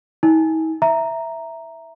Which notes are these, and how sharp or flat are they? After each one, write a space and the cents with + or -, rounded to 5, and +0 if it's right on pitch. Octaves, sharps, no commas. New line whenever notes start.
D#4 +45 G#5 -5
E5 +0 A#5 +0